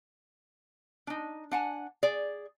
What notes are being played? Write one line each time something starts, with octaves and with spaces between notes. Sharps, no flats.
D4 D#4
D4 F#5 G#5
G#4 D5